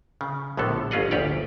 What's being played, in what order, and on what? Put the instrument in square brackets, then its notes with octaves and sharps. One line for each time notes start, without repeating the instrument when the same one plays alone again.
[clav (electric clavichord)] C#3
A#1 A2 D3 B3 A4
G1 C#4 F4 G#4 D#5 F#5
G1 D2 G4 C#5 D5